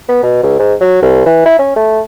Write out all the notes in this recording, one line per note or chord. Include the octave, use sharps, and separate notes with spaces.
B3
B2
C#2
G#2
F#3
C2
E3
E4
C#4
A3